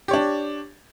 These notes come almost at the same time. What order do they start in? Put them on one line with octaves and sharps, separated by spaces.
G4 C#5 D4